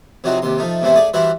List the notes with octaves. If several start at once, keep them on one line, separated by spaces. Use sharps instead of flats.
F2 C3 F#3 D#4 F#4 C5
D#2 C3 C6
F3 A3 D#4
E2 A2 C3 A3 E4 C5
A3 G#4 D5 D#6
E3 G3 E4 F#4 C5 E5